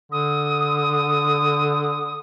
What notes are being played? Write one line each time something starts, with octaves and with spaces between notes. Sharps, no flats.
D3 D#6